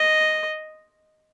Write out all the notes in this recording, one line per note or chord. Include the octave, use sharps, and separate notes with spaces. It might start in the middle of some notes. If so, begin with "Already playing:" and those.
Already playing: D#5